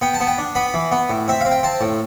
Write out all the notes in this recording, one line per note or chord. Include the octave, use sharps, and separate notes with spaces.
B3 G5
A5
B3
G5
D4
B3 B5
E3
B3
A2
C4 E5
C4 F5
G5
C4 A5
A2